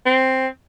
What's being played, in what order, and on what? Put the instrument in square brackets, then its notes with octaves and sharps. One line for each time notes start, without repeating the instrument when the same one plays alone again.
[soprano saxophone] C4